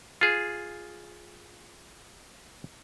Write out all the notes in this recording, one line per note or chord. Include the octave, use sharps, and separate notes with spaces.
F4 G#4